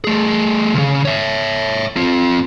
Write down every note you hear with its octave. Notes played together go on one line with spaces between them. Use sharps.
A3 G#4
C#2 C#3
C#5 E5
C4 F4